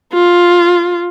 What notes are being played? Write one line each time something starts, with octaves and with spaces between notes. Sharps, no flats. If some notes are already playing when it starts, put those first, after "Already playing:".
F4